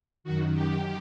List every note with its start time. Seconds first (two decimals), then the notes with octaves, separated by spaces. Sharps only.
0.24 F#2 D#3 F#4
0.54 G4